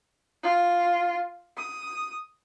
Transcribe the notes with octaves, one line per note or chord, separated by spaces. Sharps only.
F4
D#6